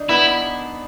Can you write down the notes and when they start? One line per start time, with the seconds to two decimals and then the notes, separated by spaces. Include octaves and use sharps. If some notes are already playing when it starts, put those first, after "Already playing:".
Already playing: D4 D#4
0.09 B3 E4